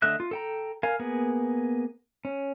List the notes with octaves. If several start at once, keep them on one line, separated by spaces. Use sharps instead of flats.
D3 A3 D#5 E5 F#6
F4
A4 G5 A#5
A#4 F5 G#5
A#3 B3 G#4
C#4